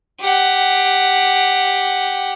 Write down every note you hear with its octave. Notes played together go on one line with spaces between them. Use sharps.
G4 F#5